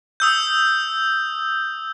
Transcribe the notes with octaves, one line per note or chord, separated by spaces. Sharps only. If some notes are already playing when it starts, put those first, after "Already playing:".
D#6 E6 G6